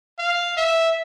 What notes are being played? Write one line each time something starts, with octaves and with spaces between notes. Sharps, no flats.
F5
E5